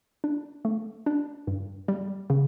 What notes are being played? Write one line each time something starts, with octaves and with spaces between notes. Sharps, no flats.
D4
A3
D4
G2
G3
C#3